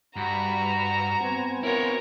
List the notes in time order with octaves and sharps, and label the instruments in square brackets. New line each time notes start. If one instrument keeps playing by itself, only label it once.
[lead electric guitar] G2 [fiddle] F#4 [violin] A#5 [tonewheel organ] B5
[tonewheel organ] B3 C4 G#5
[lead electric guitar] E4 F#4 [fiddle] A#4 C#5